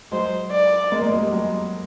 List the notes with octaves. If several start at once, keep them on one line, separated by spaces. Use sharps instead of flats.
F#3 G#3 C5
D5
G#3 A#3
G#3 A#3
F#3 G#3
G3
F#3 G#3